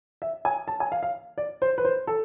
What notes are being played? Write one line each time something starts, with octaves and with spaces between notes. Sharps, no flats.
E5
G#5
A5
G#5
F5
F5
D5
C5
B4
C5
A4